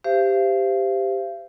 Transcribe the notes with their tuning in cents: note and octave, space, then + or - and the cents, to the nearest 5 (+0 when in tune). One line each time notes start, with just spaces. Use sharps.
G4 +0 C5 -15 F5 -45